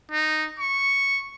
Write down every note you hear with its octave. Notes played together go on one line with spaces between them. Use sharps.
D#4
C#6